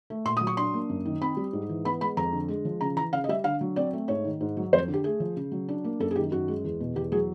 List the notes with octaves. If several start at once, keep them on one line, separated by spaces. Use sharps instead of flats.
A3
A#2 C6
D#6
F#3
C#6
D4 C6
A#3
F#2
D#3
C4 B5
G3
G#2
E3
B3 B5
G#3 B5
F2 A#5
D3
G#3
F3
C#3 A#5
E3 A#5
C#3 F5
D#5
G3 E5
D3 F5
F#3
C4 D5
A3
G#2 C#5
D#3
G#2
F#3
F2 C5
D3
G4
A3 G#4
F3
C#3
F#3
D4
A#3
F#2 A4
G#4
D#3 G4
F#2 F#4
G#3
E2
B2
E2 G4
F#3 G#4